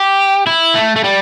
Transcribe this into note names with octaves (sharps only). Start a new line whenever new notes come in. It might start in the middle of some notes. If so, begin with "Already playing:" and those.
Already playing: G4
E4
A3
A3
G3